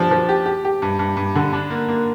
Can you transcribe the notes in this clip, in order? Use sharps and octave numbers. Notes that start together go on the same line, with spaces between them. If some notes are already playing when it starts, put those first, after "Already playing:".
Already playing: F3 D4 G4
F3
G4
G4
G4
G2
G2
G2
D3
D4
A#3
A#3